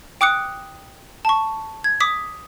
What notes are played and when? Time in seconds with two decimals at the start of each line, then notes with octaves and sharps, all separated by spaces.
0.21 G5 D6 D#6 F#6 C#7
1.25 A5 C#6
1.84 G#6
2.00 D6 D#6 B6